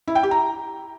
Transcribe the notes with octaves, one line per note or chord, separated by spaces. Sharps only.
E4
G5
G4
A#5